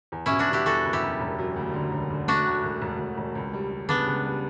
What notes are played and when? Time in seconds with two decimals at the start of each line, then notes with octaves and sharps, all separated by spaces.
0.12 E2
0.26 B2 C#4 E4
0.39 D4 F#4
0.49 G3 E4 G4
0.66 E2 F#4 A4
0.85 F#1
0.93 E4 G4
1.03 F#1
1.20 E1
1.38 F#3
1.56 D2
1.73 D3
1.92 E1
2.10 D3
2.28 A3 D4 F#4
2.46 D2
2.63 E1
2.82 E1
3.00 E1
3.17 E1
3.35 C#2
3.53 G3
3.71 G3
3.89 C#3 B3 D4
4.07 C#2
4.25 G3